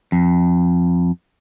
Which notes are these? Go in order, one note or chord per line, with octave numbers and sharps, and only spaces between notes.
F2